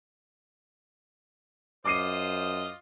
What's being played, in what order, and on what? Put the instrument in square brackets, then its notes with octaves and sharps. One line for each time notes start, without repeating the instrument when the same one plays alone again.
[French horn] F#2 [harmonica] F4 C5 D#5 [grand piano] D6 C7 D#7